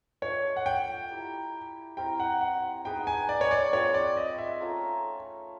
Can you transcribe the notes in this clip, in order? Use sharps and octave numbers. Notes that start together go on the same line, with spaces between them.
A3 D4 F4 C#5
F#5
G5
E4 G4 A#4
C4 E4 G4 A#4 G5
F#5
F#5
B3 D#4 G#4 B4 G5
G#5
D5
C#5
D5
C4 F4 G#4 B4 C#5
D5
D#5
E5
A3 C#4 F4 A#4